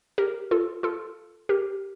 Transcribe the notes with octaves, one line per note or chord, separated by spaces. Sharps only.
G4 A#4
F4 A4
F4 A4
G4 A#4